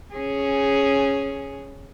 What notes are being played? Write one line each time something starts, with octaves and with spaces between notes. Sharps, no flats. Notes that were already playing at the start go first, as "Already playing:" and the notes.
C#4 G#4